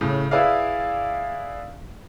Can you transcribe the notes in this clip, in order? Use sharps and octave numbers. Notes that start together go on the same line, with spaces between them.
A2 C#3
E4 G#4 B4 D5 E5 F5